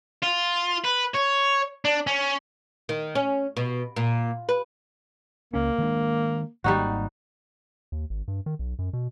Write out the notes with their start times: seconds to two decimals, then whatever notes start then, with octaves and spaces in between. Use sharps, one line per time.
0.22 F4
0.85 B4
1.15 C#5
1.85 D4
2.07 C#4
2.89 D#3
3.15 C#4
3.57 B2
3.96 A#2
4.49 B4
5.54 C#2 A#3 C#4
5.78 D#3 G#3 D4
6.64 G#1 D#3 G3 A#3 D#4 F#4
7.92 D#2
8.10 G#1
8.28 G2
8.46 D#3
8.59 B1
8.79 F#2
8.93 B2